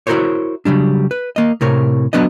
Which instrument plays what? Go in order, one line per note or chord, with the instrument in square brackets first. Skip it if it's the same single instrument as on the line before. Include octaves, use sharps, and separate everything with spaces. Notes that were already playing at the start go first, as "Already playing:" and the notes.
[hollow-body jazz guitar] E4 F#4 G4 A#4 C5 C#5
C#3 F#3 G3 D4
B4
A#3 D#5
A2 C3 A#4 C#5
F#3 B3 D4 B4 D#5